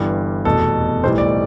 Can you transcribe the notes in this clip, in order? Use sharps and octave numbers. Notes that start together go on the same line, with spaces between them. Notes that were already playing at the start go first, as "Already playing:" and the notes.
Already playing: G1 G2 E3 G3
F1 E2 B2 A4
B1 A2 E3 G3 C5
D5